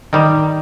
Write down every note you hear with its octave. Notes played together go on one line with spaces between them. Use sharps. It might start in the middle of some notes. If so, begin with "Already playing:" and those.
D#3 G3